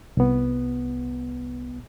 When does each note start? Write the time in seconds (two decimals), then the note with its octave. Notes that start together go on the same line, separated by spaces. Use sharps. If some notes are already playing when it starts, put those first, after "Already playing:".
0.17 C2 B3